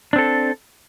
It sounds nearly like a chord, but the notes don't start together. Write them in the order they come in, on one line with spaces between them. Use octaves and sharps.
D4 C4 A4